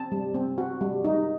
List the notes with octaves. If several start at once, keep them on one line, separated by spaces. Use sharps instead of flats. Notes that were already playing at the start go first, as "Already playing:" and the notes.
Already playing: C4 A5
G3
C4
F#4
G3
D#4